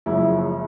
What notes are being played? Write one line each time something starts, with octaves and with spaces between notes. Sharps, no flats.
F#1 F#2 C#3 F3 G#3 E4